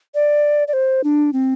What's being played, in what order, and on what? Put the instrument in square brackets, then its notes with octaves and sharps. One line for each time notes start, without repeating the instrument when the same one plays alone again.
[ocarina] D5
D5
C5
D4
C4